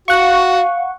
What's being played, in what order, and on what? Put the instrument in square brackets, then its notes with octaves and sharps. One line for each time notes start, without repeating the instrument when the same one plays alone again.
[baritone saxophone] F#4 [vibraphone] F5 [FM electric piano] F#5 C#6